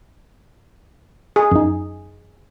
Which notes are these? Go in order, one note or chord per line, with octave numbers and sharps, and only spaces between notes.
G#4
F#2 D#4